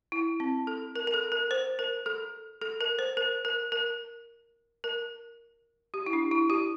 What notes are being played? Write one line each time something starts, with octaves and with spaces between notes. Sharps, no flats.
E4
C4
A4
A#4
A#4
A4
A#4
C5
A#4
A4
A4
A#4
C5
A#4
A#4
A#4
A#4
G4
E4
D4
E4
G4